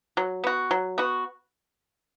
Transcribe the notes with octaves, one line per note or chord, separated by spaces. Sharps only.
F#3
B3 F#4
F#3
B3 F#4